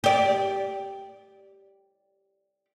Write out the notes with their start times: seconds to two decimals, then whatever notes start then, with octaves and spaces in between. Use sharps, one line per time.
0.04 G4 D5